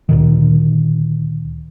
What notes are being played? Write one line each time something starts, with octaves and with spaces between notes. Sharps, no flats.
D2 A#2 D#3